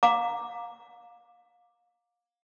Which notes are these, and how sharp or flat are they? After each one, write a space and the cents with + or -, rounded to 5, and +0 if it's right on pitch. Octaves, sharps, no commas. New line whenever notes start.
F5 +25 A#5 +0 D6 +0